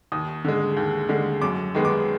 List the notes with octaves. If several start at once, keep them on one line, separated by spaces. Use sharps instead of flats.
D#2 D#6
D3 G#3
D#2
D3 G#3
F#2 D6
D#3 G#3 B3
D6